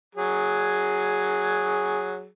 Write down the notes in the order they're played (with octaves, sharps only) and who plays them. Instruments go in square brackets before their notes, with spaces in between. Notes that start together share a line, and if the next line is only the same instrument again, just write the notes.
[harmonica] F#3 G#4